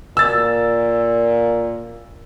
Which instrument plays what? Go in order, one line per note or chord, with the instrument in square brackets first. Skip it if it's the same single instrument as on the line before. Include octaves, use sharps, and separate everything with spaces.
[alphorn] A#2 [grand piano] E6 A6